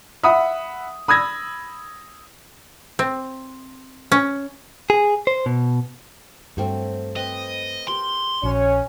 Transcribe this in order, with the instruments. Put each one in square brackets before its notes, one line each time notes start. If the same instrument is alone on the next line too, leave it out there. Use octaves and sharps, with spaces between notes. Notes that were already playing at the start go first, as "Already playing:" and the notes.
[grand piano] E5 F#5 B5 D#6
B5 D#6 E6 G#6 A#6
[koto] C4
C#4
[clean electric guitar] G#4
C5
B2
[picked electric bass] G2 [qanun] F#3 A3 C4
[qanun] C4 B4 [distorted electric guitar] D#5
[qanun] G4 A#4 [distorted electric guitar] C6
[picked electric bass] A#1 [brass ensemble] C#4 C#5 [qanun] F#4